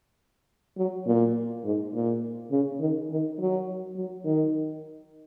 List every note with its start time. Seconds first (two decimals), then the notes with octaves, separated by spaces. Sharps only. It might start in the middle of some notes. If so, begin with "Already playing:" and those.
0.78 F#3
1.06 A#2
1.64 G#2
1.94 A#2
2.51 C#3
2.80 D#3
3.10 D#3
3.39 F#3
3.96 F#3
4.25 D#3